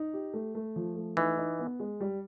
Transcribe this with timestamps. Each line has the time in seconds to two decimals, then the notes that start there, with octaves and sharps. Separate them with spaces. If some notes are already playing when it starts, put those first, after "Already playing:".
Already playing: D#4
0.13 G4
0.34 A3
0.55 A3
0.76 F3
0.96 A3
1.17 E3 D#4
1.37 D#4
1.59 B3
1.79 G#3
2.00 G3